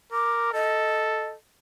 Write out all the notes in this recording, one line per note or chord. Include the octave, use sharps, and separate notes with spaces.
A#4 D6
A4 D#5